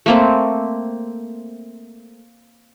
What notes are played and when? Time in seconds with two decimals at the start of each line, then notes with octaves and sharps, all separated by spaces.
0.06 A3 A#3 C4